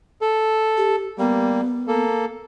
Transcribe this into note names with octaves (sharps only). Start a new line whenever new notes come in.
A4
G4
G3 A#3 B3
A#3 A4